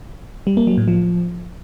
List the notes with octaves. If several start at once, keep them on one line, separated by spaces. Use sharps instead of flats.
G3
A#3
F#3
A2
F3